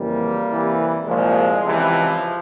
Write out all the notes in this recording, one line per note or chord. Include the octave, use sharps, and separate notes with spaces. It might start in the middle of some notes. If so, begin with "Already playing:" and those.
Already playing: F2 C#3 E3 G3 A#3
C2 C3 E3
C2 A#2 F3 G#3
C#2 C3 E3 F3